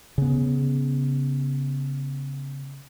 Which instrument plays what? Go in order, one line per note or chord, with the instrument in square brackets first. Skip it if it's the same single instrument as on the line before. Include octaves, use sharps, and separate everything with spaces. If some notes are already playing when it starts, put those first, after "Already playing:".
[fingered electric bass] C#3 B3